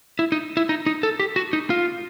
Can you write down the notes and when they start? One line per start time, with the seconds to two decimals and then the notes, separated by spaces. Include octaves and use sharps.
0.19 E4
0.32 D#4
0.57 E4
0.69 D#4
0.86 D#4
1.03 A4
1.20 G4
1.36 F#4
1.53 D#4
1.70 F4